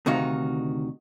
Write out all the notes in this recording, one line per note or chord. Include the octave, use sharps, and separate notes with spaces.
D2 C3 D#3 D#4 F#4 F5